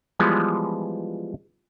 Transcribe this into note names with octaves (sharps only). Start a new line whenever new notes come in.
E3 F3 G3 G#3 B3